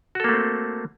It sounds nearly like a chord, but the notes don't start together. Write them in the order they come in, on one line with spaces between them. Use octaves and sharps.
F#4 A4 A#3 A3 C4